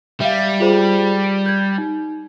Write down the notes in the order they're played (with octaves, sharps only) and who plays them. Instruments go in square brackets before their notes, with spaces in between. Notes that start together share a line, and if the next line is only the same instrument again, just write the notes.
[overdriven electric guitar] G3 [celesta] E5 F5
[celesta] F4 G#4 C5
D7
G6 G#6
D#4